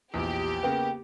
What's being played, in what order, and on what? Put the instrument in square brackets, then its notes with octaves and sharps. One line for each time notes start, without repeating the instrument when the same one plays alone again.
[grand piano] A#1 E2 [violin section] G4
[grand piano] C#3 A#3 B3 [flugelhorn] G5